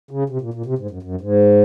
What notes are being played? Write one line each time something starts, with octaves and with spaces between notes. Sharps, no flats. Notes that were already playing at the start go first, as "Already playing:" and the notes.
C#3
C3
A#2
A#2
C3
G#2
F#2
F#2
G#2